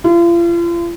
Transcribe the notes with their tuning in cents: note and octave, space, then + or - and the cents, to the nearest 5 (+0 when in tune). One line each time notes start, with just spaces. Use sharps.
F4 -40